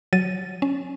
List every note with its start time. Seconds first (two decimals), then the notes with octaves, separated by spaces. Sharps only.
0.13 F#3 A6 D#7
0.62 C#4